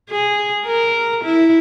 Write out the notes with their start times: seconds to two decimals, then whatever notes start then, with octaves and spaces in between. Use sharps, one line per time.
0.10 G#4
0.66 A#4
1.24 E4